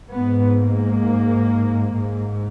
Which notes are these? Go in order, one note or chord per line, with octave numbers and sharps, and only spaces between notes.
G#2 B3
A#3
G#2